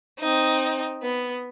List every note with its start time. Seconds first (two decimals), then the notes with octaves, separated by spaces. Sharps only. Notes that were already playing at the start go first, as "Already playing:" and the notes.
0.19 C4 D#4
1.02 B3